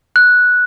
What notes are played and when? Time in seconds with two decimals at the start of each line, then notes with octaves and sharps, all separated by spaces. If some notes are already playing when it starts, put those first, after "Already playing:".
0.16 F#6